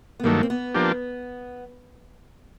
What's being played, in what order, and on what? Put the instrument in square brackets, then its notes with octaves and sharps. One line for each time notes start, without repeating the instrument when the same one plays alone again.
[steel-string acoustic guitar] B3
[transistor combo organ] G2 D#3 F#3 A3 [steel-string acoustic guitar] A#3
[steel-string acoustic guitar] C4
B3
[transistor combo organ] F3 A#3 D4 G4